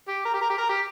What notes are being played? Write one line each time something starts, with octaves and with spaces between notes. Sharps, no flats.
G4
A#4
G4
A#4
G4
A#4
G4